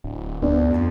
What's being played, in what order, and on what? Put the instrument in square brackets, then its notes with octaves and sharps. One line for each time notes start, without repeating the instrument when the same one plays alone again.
[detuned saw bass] D1
[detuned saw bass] D2 [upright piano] B3 D4
[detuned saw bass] F2